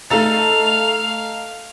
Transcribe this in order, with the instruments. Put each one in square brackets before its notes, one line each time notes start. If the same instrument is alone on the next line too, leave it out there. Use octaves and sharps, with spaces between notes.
[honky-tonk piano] A3 A6 [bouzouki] D#4 A4 [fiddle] F5 [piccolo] F7